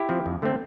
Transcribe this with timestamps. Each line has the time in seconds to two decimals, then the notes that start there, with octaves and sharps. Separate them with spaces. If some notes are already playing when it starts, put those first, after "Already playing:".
Already playing: E4 G4
0.09 F3 C4
0.26 F2
0.42 D3 A3 C4